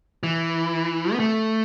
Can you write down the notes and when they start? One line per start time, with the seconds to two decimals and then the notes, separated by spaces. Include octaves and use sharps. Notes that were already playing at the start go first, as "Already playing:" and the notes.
0.23 E3
1.12 B3
1.20 A3